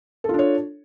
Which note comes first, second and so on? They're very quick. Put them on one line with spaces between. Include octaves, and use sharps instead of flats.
A4 F4 D4 C#5